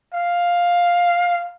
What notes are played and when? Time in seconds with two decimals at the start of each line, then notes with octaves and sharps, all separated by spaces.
0.13 F5